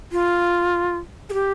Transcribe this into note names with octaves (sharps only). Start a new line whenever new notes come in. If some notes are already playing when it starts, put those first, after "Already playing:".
F4
G#4
G4